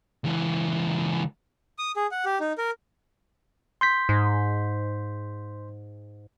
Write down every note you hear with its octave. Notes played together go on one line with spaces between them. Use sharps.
C#2 E3
D#6
G#4
F#5
G4
D#4
A#4
C6 G6 B6
G#2